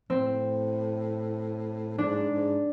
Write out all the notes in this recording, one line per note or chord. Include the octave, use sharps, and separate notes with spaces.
A2 C4
G#2 D4
G#2